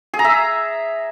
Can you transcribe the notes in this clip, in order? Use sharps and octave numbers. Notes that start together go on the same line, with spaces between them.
G#4
A#5
E5